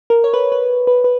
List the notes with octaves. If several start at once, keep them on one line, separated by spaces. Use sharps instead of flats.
A#4
C#5
B4
B4
B4
B4